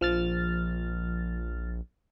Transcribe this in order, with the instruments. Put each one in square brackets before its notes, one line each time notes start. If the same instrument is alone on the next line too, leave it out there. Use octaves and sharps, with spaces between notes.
[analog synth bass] A#1 [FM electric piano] F3 F6 A6